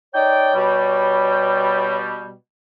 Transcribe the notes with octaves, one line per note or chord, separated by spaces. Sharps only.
D#4 C#5 D5 G5
B2 G3